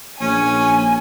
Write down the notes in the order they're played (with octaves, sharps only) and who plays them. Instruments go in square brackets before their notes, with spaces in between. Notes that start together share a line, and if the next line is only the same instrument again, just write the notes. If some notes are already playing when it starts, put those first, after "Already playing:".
[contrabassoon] A#1 [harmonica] C#4 [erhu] G#5